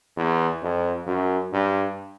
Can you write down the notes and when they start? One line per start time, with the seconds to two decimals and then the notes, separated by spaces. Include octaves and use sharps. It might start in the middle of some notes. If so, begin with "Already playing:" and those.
0.17 E2
0.62 F2
1.07 F#2
1.53 G2